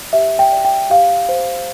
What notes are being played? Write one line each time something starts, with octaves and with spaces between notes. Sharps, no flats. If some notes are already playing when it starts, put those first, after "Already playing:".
Already playing: D5
G4 E5
G5
D5
G5
G4 F5
C5